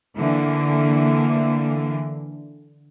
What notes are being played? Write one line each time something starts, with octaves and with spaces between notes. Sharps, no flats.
D3 E3 A#3